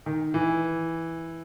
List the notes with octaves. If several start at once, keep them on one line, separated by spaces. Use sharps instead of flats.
D#3
E3